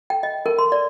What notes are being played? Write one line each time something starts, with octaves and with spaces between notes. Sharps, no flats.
G5
D#5
A#4
C6
D5